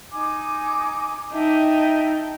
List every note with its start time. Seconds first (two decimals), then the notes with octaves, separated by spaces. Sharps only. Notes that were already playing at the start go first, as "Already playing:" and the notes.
0.13 D#4 G#5 D6
1.33 D#4 E5 G5 A5